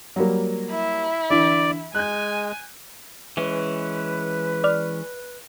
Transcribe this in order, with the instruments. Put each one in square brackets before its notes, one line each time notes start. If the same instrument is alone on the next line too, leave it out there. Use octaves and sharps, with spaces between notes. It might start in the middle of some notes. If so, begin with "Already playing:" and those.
[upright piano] F#3 G3 A#3
[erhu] E4
[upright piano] D3 E3 [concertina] D5
[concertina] G#3 [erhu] G#5 [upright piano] F#6 G6
[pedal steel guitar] E3 G#3 C#4 [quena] B4
[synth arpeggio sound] D5 F6